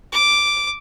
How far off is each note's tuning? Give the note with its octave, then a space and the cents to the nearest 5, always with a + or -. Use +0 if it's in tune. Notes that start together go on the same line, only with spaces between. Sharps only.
D6 +0